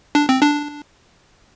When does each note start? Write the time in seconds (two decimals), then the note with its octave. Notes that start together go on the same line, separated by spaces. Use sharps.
0.15 D4
0.29 C4
0.42 D4